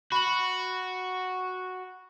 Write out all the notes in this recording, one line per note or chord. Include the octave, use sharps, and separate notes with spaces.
F#4 B5 F#7